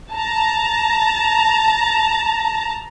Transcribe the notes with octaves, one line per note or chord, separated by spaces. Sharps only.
A5 A#5